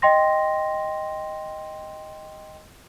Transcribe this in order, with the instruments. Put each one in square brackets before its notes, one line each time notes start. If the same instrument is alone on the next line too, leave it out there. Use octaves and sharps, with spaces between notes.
[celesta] D#5 G5 C6 A#6